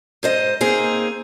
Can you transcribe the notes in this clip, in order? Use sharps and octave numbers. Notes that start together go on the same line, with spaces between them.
G#2 C5 D#5
A#3 C4 D#4 G#4